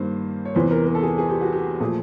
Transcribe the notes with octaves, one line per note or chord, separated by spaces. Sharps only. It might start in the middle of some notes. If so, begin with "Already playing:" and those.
Already playing: G2 D#3 G3 A#3 C5
C#5
E2 C3 E3 C5
A#4
A#4
A4
G#4
G#4
G4
F#4
G4
A#2 F3 A3 G#4